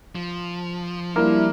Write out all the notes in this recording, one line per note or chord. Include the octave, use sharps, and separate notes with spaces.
F3
G3 A#3 D4 E4